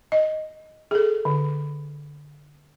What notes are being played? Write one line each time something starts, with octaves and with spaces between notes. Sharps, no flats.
D#5
G#4 A4
D3